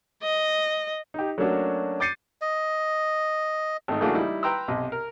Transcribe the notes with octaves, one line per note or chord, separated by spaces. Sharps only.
D#5
D#4 G4
F#3 A3 A#3 C#4 D4 F#4
D6 G6 A6 C7 C#7 D#7
D#5
G#1 A3 D#4
C#3 E3 A3 A#3 D4 F#4
G3 D#4 E4
B4 G5 A#5 C6 E6
B1 C3 G4 D#5
A#4